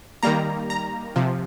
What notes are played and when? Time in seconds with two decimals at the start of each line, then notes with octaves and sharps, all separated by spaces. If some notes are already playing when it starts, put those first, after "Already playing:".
0.23 D#3 G3 A#3 A#5
0.70 A#5
1.16 C3 F3